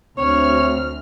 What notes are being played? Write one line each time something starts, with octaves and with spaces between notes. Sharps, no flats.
D2 C4 C#5 F6